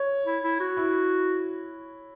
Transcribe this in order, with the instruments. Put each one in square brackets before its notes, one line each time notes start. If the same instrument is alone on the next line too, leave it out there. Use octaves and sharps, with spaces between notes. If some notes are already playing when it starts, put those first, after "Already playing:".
Already playing: [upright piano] C#5
[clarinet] E4
E4
F#4
[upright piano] E4